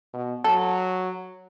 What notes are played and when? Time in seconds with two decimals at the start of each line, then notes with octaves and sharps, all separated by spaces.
0.13 B2
0.44 F#3 A4